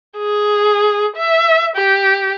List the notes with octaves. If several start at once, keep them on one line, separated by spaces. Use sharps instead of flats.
G#4
E5
G4